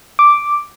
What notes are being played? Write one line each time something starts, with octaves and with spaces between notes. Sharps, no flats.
D6